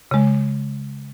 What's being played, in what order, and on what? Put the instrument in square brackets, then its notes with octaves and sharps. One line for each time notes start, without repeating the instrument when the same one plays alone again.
[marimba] C#3 G#3